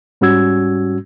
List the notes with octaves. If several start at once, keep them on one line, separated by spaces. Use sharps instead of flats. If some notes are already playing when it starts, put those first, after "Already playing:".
G#2 G3 C#4 F#4 E6 G#6